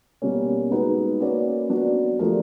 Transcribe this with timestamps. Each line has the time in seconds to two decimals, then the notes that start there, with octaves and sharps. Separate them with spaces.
0.22 B2 G3 A#3 C#4
0.70 G#3 B3 D#4 F#4 B4
1.20 A#3 C#4 F#4 B4 D5
1.69 F#3 B3 D4 F#4
2.19 F3 A3 D4 G4 A#4